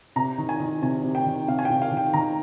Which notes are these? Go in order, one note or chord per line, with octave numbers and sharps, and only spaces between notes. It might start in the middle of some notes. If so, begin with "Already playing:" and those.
C3 A#5
D#3
G#5
D#3
C3 G#5
C3
G5
D#3
C3 F5
G#5
C3 G5
F5
D#3
G5
D#3 A#5